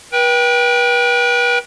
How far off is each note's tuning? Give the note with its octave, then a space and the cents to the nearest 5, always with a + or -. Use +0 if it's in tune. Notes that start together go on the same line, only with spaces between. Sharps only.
B4 -35 G5 +5